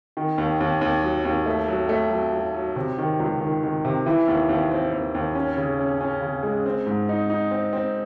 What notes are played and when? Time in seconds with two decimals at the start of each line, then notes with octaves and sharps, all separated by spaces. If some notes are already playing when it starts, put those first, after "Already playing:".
0.17 D#3
0.38 D#2
0.60 D#2
0.81 D#2
1.02 F#3
1.25 D#2
1.46 A3
1.68 F#3
1.89 A3
2.10 F#3
2.33 F#3
2.54 F#3
2.76 C3
2.98 D#3
3.20 C#2
3.41 D#3
3.63 D#3
3.85 C3
4.06 E3
4.28 D#2
4.49 D#2
4.71 C4
4.93 D#2
5.14 D#2
5.35 C#4
5.57 C#3
5.79 C#4
6.01 C#4
6.21 C#3
6.43 G#3
6.66 C4
6.86 G#2
7.09 D#4
7.30 D#4
7.51 C4
7.73 C4